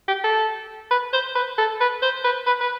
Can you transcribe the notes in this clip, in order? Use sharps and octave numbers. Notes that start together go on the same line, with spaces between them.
G4
A4
B4
C5
B4
A4
B4
C5
B4
B4
B4